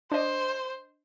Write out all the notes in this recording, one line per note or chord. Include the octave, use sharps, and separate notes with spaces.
D4 C5 D#5